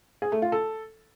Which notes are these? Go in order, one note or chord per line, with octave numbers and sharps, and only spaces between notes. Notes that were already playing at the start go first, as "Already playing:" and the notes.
G#4
A3
F4
A4